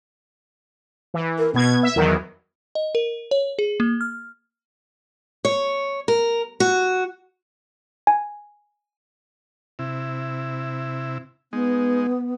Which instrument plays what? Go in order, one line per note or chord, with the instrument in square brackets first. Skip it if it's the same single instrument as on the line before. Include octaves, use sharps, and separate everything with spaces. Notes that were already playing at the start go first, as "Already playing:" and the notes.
[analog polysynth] E3
[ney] A#4
[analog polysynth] B2 G#6 [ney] B3
[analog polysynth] E5
[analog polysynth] E2 D#3 F#3 [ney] A#4
[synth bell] D#5
A#4
C#5
G#4
A#3
F6
[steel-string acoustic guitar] C#5
A#4
F#4
[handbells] G#5
[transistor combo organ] C3 E4
[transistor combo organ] G#3 D#4 [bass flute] B3